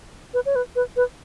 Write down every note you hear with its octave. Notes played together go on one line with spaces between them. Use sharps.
B4
C#5
B4
B4
B4